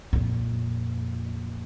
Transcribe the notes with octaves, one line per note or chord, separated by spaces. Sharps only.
F2 A#2